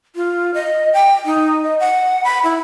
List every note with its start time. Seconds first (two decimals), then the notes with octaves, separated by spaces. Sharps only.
0.16 F4
0.54 D#5
0.93 G5
1.25 D#4
1.63 D#5
1.80 F#5
2.24 B5
2.44 E4